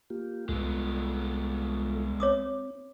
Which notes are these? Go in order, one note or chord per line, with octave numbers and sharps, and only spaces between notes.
A#3 F4 G4
C2 G#3 B3 F4 A4
C4 C#5 D6 D#6